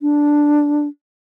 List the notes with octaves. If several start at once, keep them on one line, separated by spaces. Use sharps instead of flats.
D4